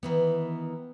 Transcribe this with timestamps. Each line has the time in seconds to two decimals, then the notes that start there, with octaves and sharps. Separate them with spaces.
0.03 D#3 E3 B3